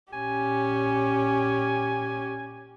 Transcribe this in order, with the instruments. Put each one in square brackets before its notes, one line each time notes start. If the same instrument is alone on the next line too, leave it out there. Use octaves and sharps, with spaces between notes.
[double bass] A#2 C#4 [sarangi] G4 [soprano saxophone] G#5